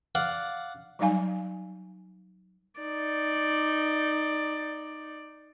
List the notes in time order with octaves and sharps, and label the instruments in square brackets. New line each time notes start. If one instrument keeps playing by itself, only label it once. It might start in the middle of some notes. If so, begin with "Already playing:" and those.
[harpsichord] D5 F5 F#5
[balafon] F#3 G3 D#4 F5 G#5
[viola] D#4 D5